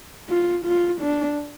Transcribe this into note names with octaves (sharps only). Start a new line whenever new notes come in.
F4
F4
D4